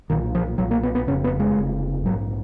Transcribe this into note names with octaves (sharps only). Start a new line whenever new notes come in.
B1 A#2 D#3
F3
B1 A#2 F#3
A#3
B3
B3
F1 F2 C#3 C#4
B3
G#3
F1 F2 C#3
A#1 G#2 F#3